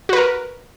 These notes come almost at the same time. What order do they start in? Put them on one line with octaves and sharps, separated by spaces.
F#4 B4 A#4